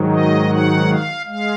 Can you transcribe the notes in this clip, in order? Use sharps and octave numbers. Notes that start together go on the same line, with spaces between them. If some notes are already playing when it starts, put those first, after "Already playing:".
Already playing: G#2 D#3 F#3
D#5
F#5
F5
G#3 F5